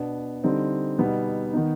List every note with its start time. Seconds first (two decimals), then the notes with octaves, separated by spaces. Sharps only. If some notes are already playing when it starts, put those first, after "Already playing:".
Already playing: B2 B3 D4
0.44 D3 G3 C4 D#4
0.98 B2 G3 B3 D#4
1.53 D#3 B3 D#4